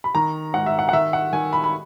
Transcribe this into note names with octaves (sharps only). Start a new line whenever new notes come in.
B5
D#3 A#5
G#2 F#5
E5
F#5
F#5
D#3 E5
F#5
D#3 G#5
B5
B5